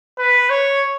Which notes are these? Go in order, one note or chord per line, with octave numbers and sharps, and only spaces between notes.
B4
C#5